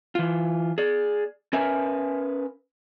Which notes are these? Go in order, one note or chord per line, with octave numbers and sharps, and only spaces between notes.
E3 F4
G#4 D5
C#4 A#4 B4 E5 G#5